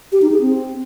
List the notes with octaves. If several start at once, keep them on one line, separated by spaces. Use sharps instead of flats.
G4
D#4
G#4
C4